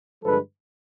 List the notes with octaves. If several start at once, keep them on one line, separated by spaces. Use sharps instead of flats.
G2 D3 F3 G#3 A4 B4